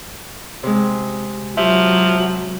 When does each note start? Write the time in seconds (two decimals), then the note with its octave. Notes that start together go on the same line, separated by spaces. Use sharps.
0.63 C3 G#3
1.57 F3 F#3 G4 E5